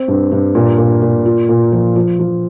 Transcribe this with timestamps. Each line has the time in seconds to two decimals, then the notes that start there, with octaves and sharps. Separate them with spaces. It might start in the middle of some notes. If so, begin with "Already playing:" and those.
Already playing: C4
0.08 G2
0.32 G2
0.55 A#2
0.78 A#2
1.02 A#2
1.26 F4
1.49 A#2
1.72 F3
1.96 F3
2.19 F3